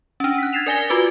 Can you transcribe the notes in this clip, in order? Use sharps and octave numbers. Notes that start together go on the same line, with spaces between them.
C#4 D4
F#6 B6
G#6 A6 B6 C7 E7 F7
A#4 D5 G#5 A#6 G7
F4 F#4 B4 D6